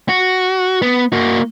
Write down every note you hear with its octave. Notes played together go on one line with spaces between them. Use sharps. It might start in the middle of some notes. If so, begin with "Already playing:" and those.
F#4
B3
A#3 F#4